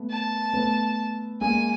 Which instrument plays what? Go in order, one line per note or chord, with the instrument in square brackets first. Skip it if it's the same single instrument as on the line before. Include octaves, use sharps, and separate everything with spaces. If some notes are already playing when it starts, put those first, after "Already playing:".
Already playing: [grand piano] A3 B3
[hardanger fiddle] A5
[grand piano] A3 B3
[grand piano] G#3 A#3 [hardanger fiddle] G#5